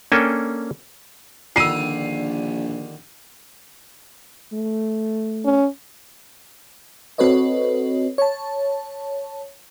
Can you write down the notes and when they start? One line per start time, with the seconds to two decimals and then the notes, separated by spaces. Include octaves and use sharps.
0.12 A#3 C#4 D4 A4 G5 G#5
1.56 A#1 D3 D#3 G3 F4 E6 C7 D#7
4.52 A3
5.45 C#4
7.18 C4 F#4 A4 B4 C#5 D#5
8.18 C#5 A5